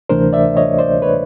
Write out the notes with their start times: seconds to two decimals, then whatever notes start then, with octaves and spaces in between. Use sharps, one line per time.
0.09 D2 C3 E3 A3 D4 A#4 C5
0.33 D5 E5
0.57 C#5 D#5
0.79 C5 D5
1.02 B4 C#5